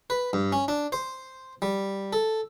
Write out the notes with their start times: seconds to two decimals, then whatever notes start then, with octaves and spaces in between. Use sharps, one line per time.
0.10 B4
0.33 G2
0.52 C#4
0.68 D4
0.92 C5
1.62 G3
2.13 A4